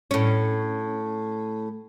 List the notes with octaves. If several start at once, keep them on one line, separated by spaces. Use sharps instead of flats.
A2 C#4